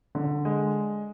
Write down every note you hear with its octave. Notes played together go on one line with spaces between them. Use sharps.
D3
G#3